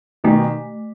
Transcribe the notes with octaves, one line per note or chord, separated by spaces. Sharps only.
B2 D#3 A3